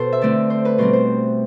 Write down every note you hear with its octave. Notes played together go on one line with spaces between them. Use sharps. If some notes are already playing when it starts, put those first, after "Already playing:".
Already playing: B2 A4 C5
E5
D3 A3 C4 D5
C5
B4
B2 G3 C4 C5
C5